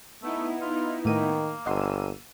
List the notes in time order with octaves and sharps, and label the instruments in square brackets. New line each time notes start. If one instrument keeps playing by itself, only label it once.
[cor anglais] A3 [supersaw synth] B3 D#4 E4
[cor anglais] F4
[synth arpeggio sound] A2 A3 D#7 [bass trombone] D#3 [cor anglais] A#3
[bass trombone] G1 [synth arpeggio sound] D#5 F#5 C6 [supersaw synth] E6 D#7